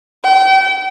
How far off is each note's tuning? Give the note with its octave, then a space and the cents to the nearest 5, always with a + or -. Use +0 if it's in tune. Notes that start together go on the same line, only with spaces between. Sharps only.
G5 -35